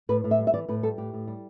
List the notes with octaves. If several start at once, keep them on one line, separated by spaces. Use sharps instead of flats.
A2 B4
A2
E5
G3
E5
E3 D5
A2 B4
G3 A4
A2 G4
A2
G3